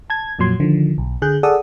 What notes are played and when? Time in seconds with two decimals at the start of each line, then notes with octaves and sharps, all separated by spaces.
0.10 A5 G#6
0.39 F2 A#2 F#3 C6 G#6
0.60 D3 D#3 F3
0.98 B1
1.22 D3 G#4 F#6 G6
1.43 G#4 A4 D5 F#5 D#6 E6